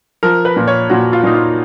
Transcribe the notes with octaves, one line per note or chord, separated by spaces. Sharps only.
F3 A#4
B4
A#2
C#5
A#2 F#4
F4
A#2 D#4
F4